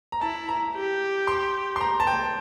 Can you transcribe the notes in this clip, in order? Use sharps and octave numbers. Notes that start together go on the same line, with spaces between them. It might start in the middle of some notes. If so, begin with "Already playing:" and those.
A#5
E4 A5
A#5
G4
C6
C6
A#5
A5
G5